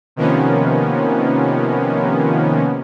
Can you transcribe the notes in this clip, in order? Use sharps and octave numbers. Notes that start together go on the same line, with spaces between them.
C3 D#3 F3 A#3 B3 C#4